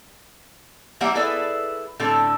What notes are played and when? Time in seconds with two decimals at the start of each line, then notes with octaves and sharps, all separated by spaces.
1.00 E3 G3 A#3 E5 F#5
1.15 E4 G#4 A4 B4 D5 E5
2.00 A2 D3 C4 A4